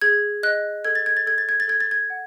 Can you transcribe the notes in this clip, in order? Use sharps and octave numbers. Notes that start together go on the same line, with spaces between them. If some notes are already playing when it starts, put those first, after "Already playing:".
G#4 G#6
D#5 F#6
A4 G#6
A6
G#6
A6
A4 G#6
A6
G#6
A6
A4 G#6
A6
G#6
F#5